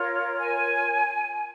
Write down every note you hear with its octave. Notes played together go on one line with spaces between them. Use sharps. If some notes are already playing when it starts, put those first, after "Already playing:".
Already playing: F4 A#4 C#5
G#5